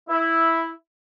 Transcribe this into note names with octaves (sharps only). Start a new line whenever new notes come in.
E4